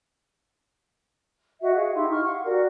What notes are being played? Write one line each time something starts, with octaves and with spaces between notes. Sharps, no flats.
F#4 D#5 E5
G#4 F5 F#5
D#4 E4 G4 C6
C#6 F6
F5 F#5
F#4 G4 A#4 D5